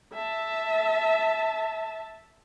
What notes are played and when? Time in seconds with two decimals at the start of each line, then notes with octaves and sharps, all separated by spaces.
0.14 E5 A5